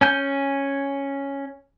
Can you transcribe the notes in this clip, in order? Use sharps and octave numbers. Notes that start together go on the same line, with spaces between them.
C#4 G#5 G6